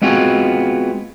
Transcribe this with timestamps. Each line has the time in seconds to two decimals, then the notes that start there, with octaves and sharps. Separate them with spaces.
0.02 G#3 B3 C4 F4 F#4 G#4